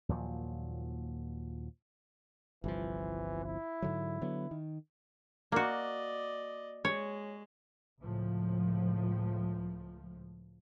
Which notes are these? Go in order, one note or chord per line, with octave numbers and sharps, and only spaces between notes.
D#2 A#2 F3 F#3
G1 C2 E3 F3
E4
G#2 D3 F#3
D3 F#3 B3
D#3
A#3 F#4 D5 D#5
G#3 C#5
C#2 A2 F3